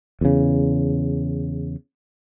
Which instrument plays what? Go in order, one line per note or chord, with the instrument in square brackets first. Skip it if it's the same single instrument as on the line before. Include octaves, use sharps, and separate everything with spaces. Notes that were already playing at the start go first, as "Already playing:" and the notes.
[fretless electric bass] E2 C#3